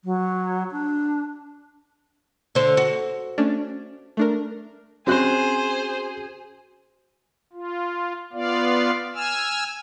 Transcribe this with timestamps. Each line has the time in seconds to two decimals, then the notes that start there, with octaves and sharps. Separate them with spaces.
0.05 F#3
0.71 D4
2.55 D3 C5
2.77 F#4
3.38 A3 C#4 D4
4.17 A3 D4 A#4
5.07 C4 C#4 F#4 G#4 C5 F#6
7.53 F4
8.33 B3 F4 D5 F5
9.14 G#5 E6 F6